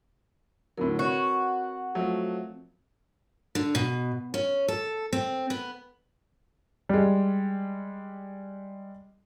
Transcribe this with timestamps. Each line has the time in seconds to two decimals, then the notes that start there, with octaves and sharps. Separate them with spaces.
0.78 A2 D3 F#3 C4 A#4
0.99 F#4 B4 C#5
1.95 F3 F#3 A3
3.55 D3
3.75 B2
4.34 C#4
4.68 A4
5.13 C4
5.50 B3
6.89 G3 G#3